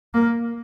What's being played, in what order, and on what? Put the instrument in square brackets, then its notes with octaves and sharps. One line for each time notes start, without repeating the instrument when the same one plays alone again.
[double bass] A#3